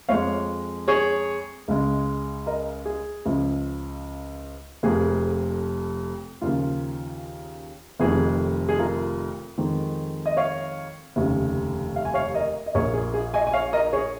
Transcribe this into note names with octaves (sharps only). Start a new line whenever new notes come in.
F2 F3 G#3 C#5 F5
G#4 C#5
C#2 C#3 G#3
A#4 D#5
G#4
C#2 C#3 F3
F1 F2 F3 A#3 G#4
D#2 C#3 F3 A#3 F4
F1 F2 D#3 G#4
G#4
F4 A#4
F2 D#3 G#3
D#5
C#5 F5
F1 D#2 C#3
F5
G#5
C#5 F5
A#4 D#5
D#5
A#1 A#2 A#3 G#4 C#5
G#4
G#4
D#5 G#5
G#5
C#5 F5
A#4 D#5
G#4 C#5